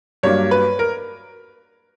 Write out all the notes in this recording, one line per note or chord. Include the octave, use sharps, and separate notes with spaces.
G2 F#3 A#3 D4 C#5
B4
A#4